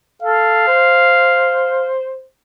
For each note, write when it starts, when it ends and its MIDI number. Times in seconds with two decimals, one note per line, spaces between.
0.22 0.65 69
0.22 1.90 77
0.67 2.22 72